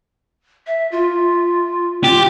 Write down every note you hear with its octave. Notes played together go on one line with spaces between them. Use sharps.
E5
F4
F4 G4